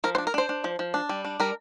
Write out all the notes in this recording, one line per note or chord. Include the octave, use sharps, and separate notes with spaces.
F3 A#4
C5
D4
A#4
D4 C5
D4
F3
F3
D4
G3
D4
G3 A#4